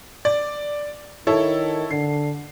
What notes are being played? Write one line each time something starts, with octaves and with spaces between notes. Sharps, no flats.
D5
D#3 E4 A4 C#5
D3 C7